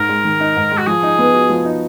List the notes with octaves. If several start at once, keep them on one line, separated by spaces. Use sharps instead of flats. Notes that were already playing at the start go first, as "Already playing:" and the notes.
Already playing: G#2 A#4
G#3
D#3
D#4
G#2
G#3
F#4
F3 G#4
D#4
B3
F#4
F3
D#4